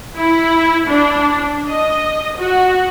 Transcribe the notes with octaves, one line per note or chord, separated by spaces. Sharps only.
E4
D4
D#5
F#4